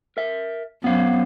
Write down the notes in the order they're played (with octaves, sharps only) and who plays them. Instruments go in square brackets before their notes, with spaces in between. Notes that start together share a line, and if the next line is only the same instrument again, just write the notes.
[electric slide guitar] A#4 E5
[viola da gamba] F#2 [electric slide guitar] B3 C4 F5